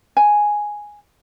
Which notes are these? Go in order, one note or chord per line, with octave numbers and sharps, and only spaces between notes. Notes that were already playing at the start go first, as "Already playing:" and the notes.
G#5